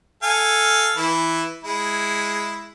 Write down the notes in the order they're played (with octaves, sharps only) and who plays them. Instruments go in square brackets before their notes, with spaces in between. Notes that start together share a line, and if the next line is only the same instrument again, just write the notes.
[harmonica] A4 F5 G#5
E3 E4
G#3 E4